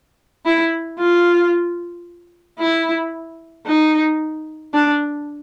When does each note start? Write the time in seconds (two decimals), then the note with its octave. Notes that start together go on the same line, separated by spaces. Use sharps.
0.45 E4
0.98 F4
2.59 E4
3.66 D#4
4.73 D4